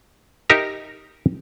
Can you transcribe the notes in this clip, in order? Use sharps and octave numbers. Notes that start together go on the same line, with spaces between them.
D#4 G4 A#4 E5 A#5